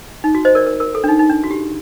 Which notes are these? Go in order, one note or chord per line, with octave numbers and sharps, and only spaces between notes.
D#4
F#4
C5 D#5
A#4 D5
A#4
A#4
A4
D4
D#4
D#4
D4
F#4
G4